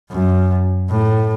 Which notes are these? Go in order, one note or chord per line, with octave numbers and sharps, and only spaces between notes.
F#2
A2